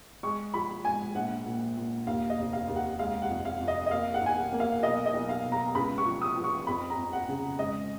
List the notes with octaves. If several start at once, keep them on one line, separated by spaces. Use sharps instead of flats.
G#3 C#6
F3 B5
G#2 G#5
A#1 F#5
A#2
A#2
D#2 F5
D#5
F1
F5
D#2
F#5
G#3 F5
F#5
F2
F5
F2
D#5
D#5
A#3 F5
F#5
D#3 G#5
F#5
A#3
F5
B1 D#5
D#5
B1
F5
B2
A#5
C#2 B5
C#6
F3
D#6
F3
C#6
F2 B5
A#5
F2
F#5
C#3
G#2 D#5